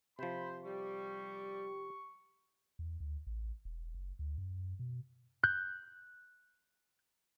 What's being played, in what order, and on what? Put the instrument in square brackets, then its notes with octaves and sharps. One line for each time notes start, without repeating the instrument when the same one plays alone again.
[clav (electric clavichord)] C3 F3 [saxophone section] C5 [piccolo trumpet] B5
[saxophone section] G3 [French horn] G4 [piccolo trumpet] C#6
[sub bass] E2
D2
A1
E1
F#1
D2
F#2
B2
[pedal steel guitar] F#6 G6